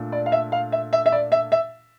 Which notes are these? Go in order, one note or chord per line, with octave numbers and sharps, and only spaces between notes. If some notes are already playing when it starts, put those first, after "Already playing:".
Already playing: A#2 A3 D4
D5
F5
E5
F5
E5
E5
E5
D5
E5
E5